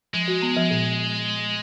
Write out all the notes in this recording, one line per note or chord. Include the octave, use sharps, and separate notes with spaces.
F3 G#3
F#4
B3
F3
A#2